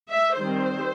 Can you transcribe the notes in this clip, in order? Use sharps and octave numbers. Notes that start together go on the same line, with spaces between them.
E5
D#3 G3 C4 C5